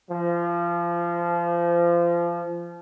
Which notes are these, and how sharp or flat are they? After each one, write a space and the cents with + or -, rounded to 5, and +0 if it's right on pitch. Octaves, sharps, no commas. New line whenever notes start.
F3 -25